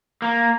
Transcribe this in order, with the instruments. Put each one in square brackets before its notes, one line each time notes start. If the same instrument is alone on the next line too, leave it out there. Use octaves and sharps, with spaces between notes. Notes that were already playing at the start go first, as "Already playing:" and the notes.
[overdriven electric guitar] A#3